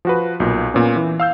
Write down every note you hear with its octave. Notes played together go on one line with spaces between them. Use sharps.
F3 F#4 B4
B1 A#2
A#2 B3 C#4
E3
F5 E6 G6